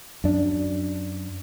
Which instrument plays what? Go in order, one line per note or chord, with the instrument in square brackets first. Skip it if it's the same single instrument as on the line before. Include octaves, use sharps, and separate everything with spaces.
[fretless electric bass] F#2 D4